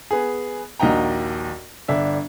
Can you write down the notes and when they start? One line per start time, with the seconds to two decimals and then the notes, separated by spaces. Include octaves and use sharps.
0.11 B3 G#4
0.80 A#1 D#2 F#4 D#5 G5 A#5
1.88 G1 D4 E5